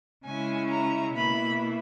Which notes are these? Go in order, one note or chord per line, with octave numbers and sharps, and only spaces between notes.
C#3 G#3 C#4 E4 G#5
A#5
B2 A#3 E4 B5